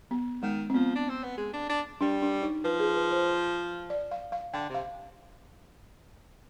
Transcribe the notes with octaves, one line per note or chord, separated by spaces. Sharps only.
B3
D#3 G#3
C4
F3 B3
D4
C4
B3
G#3
D4
D4
G3 D4
D4
D#4
F3 B4
G#4
B4
C5
D5
F5
F5
D3 G5
C3
F5